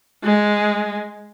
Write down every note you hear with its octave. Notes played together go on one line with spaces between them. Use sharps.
G#3